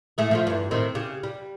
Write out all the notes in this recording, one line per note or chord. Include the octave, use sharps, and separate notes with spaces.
A2 A3 G#4
F3 A3 F4
E2 G2
A2 D#3 C4
C#3 G4
G3